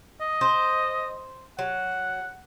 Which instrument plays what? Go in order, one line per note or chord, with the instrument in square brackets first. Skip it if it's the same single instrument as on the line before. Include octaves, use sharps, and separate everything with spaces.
[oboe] D#5
[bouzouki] C5
[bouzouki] F#3 [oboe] F#5